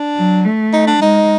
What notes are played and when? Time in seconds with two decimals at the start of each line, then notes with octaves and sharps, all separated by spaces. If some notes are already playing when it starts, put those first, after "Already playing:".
Already playing: D4
0.17 F#3
0.45 A3
0.73 D#4
0.87 D4
1.02 G#3 D#4